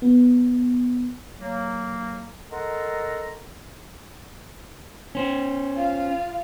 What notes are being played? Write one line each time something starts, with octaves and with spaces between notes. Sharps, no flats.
B3
F#3 A#3
A4 A#4 D#5 F#5 A#5 C6
C#4 C5
F4 F5